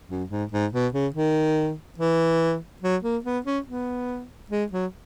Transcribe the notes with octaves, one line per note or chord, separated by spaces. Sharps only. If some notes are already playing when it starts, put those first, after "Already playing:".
F#2
G#2
G#2
B2
C#3
D#3
E3
F#3
A#3
B3
C#4
B3
G#3
F#3